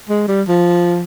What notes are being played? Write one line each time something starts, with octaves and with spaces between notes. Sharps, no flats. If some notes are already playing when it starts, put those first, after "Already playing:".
G#3
G3
F3